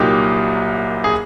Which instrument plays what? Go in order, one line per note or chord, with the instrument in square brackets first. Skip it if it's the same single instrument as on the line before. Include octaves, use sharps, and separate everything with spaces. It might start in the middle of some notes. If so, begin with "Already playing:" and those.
Already playing: [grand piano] C2 A#2 F#3 A#3 D#4 G4
G#4